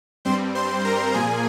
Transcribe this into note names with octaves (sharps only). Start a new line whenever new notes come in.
G2 G3 C4 C5 C6
C5 C6
A#4 A#5
A#2 F3 A#3 G#4 G#5